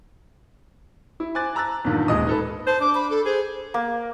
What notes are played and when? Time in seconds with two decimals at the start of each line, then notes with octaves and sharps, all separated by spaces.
1.20 E4
1.35 C5 G#5 D6 F#6 A6
1.55 A5 A#5 E6 F#6 A6
1.85 E2 G2 A#2 D#3
2.08 D#1 G#3 D#5 D#6
2.27 D#4 A4 B4
2.67 C5 A5
2.81 D4 D6
2.95 B5
3.10 A4
3.25 G#4 C5
3.74 A#3